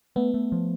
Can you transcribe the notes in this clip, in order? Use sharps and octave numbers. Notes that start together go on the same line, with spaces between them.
A3 B3
A3
F3